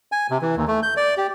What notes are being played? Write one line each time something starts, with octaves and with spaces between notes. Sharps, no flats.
G#5
C3
E3
D#2
A3
G6
D5
G4